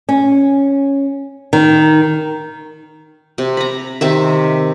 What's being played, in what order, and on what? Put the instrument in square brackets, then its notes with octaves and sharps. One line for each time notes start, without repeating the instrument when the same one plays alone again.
[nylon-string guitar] C#4
D#3
[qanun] C3
A#5 B5
C3 D#3 E5